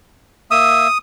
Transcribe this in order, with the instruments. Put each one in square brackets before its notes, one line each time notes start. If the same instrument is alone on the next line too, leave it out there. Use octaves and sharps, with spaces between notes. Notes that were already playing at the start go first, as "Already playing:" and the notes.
[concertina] A#3 E5 E6 [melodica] D#6